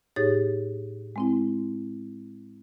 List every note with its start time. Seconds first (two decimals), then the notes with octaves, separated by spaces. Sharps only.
0.16 A2 D#4 G4 G#4 C#5 A6
1.16 G#3 C4 E4